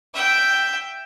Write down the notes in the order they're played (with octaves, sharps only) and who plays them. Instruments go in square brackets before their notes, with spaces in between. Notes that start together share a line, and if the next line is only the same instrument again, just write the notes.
[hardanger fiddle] E5 G5